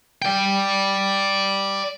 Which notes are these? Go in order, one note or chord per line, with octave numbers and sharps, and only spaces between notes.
D5 G5